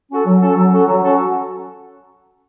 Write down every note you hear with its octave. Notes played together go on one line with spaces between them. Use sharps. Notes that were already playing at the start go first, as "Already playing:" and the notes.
C#4 F#4 A4
F#3
C#4 F#4 A4
F#3
C#4 F#4 A4
F#3
C#4 F#4 A4